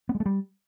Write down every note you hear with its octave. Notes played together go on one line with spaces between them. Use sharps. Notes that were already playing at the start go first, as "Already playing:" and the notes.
B3
G#3
A3
G3